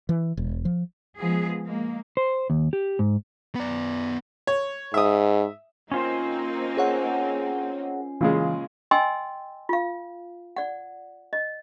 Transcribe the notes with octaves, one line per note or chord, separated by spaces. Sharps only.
E3
E1
F3
F3 G#3 B3 G#4
G#3 A#3
C5
D#2
G4
G#2
B3 D5
C#5
G#2 E5 D#6
A#3 C4 C#4 D#4 F4 C5
G#4 C#5 F#5
A#2 C#3 E3 G#3
D#5 G5 G#5 C6 E6
F4 F5
D5 F#5
D#5